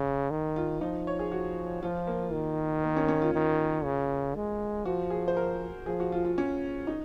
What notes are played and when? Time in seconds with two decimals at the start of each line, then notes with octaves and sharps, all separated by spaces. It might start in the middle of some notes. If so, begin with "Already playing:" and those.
Already playing: C#3
0.31 D#3
0.56 F4
0.81 F3 D#4
1.07 C#5
1.19 G#4
1.32 F#4
1.83 F3 F4
2.07 A#3
2.33 D#3
2.84 A#3
2.97 C#4
3.08 C#4
3.22 F4
3.34 D#3
3.84 C#3
4.35 G#3
4.85 F3 F#4
5.10 G#4
5.28 C5
5.37 A#4
5.86 F3 G#4
6.00 F#4
6.12 F4
6.25 F4
6.38 C#4
6.87 D#4